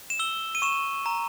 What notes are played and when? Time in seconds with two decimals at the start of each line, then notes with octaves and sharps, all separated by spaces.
0.10 E7
0.19 E6 G7
0.55 D#7
0.62 C#6 E7
1.06 A#5